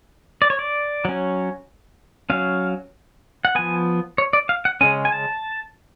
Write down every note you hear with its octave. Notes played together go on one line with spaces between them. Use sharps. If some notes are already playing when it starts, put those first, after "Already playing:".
D5
C#5
D5
F#3 C#4
F#3 C#4 F5
F#5
F3 B3 G#5
C#5
D5
F5
F#5
C#3 G#3 C#4 G#5
G#5
A5